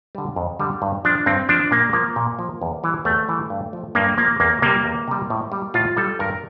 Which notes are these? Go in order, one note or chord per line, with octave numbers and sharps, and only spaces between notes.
D3 G3
F2
D3 G3
G2
F3 D4
G2 C4
F3 D4
A#2 A#3
F3 A#3
A#2
F3
E2
E3 G3
E2 A3
E3 G3
G2
F3
G2 A#3
F3 A#3
E2 A#3
C3 G3 A#3
E2
C3 G3
A2
G3
A2 F4
G3 A4
G2 A#4